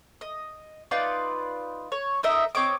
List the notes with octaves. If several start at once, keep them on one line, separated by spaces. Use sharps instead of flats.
D#5
D#4 F4 B4 D5
C#5
D#4 A#4 D#5 E5
C4 C#5 D#5 D6